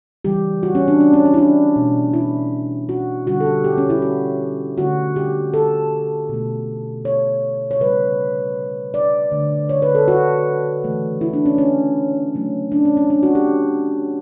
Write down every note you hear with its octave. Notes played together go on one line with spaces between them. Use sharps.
C#3 E3 G3 G4
F#4
C#4
D4
D4
C#4
C#4
E4
D4
B2 A3
E4
F#4
D3 G3 F#4
A4
G4
G4
C#4
E4
F#4
D3 A3 F#4
G4
A4
B2 A3
C#5
C#5
C#3 G3 B4
D5
D3 A3
C#5
B4
A4
F#4
C#3 E3 A3
E4
D4
C#4
C#4
C#3 F#3 A3
D4
C#4
C#4
D4
F#4
G4